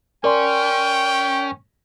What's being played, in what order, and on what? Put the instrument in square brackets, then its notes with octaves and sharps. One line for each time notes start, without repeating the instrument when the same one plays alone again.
[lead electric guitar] C#4 [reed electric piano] A#4 D5 C6 [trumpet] G5